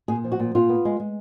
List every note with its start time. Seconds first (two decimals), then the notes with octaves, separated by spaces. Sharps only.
0.08 A#2 G#4
0.24 F3
0.32 F#4
0.40 A#2
0.55 A#2 F4
0.69 B3
0.85 G#3
1.00 G#3